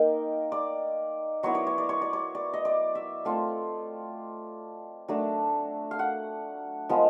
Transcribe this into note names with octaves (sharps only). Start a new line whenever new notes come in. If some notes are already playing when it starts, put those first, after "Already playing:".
Already playing: A#3 D#4 G5
D5
F#3 B3 E4 C#5
D5
C#5
D5
C#5
D5
C#5
D5
D#5
D5
E5
A3 C4 F4 F5
F#3 A3 D4
F5
F#5
F3 G#3 B3